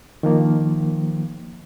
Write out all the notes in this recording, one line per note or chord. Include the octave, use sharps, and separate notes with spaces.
D#3 F3 A#3